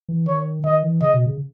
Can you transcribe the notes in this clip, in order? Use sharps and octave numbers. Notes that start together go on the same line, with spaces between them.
E3
D#3 C#5
D#3 D#5
E3
C#3 D#5
B2
C#3